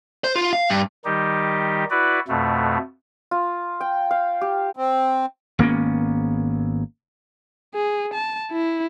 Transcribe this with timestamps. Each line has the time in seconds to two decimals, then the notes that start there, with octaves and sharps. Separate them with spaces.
0.24 C5
0.35 F4
0.53 F5
0.70 G2
1.05 D#3 G3 D#4 G4
1.90 E4 F#4 B4 D5
2.28 F2 B2 A3
3.31 F4
3.80 G5
4.11 F5
4.41 G4
4.77 C4
5.59 G#1 A#3 B3 C#4
7.74 G#4
8.14 A5
8.52 E4